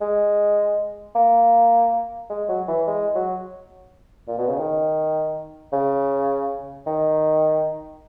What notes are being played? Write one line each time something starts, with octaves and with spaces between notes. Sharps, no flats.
G#3
A#3
G#3
F#3
E3
G#3
F#3
A#2
B2
C#3
D#3
C#3
D#3